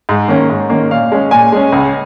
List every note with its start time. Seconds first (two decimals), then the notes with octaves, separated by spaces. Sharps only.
0.09 G#2
0.28 D#3 A#3 C#4
0.50 G#2
0.70 D#3 A#3 C#4
0.91 A#2 F5
1.12 G#3 C#4
1.31 A#2 G#5
1.52 G#3 C#4
1.72 C#2